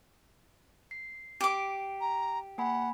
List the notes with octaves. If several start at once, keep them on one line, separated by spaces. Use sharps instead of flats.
C7
G4 D6
A#5
A#3 F#5 G#5 B5